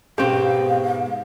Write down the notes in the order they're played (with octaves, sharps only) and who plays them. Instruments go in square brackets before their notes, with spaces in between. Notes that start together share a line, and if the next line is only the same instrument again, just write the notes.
[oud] G#2 B2 [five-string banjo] C4 G4 [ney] F5